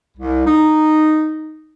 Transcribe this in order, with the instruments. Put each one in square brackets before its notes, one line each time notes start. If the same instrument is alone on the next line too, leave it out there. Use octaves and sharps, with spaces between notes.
[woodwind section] C2
D#4